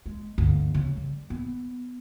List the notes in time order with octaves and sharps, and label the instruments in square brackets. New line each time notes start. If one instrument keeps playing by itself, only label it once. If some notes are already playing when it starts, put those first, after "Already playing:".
[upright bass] G#3
D2 G2
C#3
G3
B3